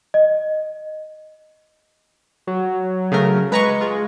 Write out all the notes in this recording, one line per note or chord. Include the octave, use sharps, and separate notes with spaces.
D#5
F#3
C#3 A3 A#4
G#3 B4 A#5 C#6
F4 G#4